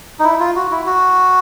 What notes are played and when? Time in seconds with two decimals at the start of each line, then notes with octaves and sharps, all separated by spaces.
0.19 D#4
0.24 E4
0.40 F4
0.56 F#4
0.71 E4
0.86 F#4